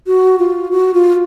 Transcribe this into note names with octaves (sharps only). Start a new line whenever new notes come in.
F#4
F4
F#4
F4